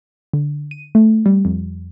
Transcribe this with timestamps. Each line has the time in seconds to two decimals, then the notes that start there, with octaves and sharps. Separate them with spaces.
0.33 D3
0.71 D#7
0.95 A3
1.26 G3
1.45 F2